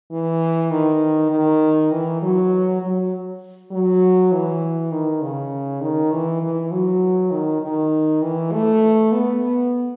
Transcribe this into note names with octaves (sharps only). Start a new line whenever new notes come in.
E3
D#3
D#3
E3
F#3
F#3
F#3
E3
D#3
C#3
D#3
E3
E3
F#3
D#3
D#3
E3
A3
B3